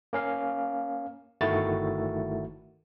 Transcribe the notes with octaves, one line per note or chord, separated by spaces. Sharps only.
A#3 C#4 F5
G1 D#3 A3 E4 F#4 A6